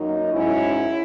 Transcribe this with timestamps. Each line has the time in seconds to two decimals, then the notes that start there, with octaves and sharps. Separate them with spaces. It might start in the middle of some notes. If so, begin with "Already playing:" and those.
Already playing: F#2 D#3 A#3 D#4
0.32 G#2 F#3 C#4 E4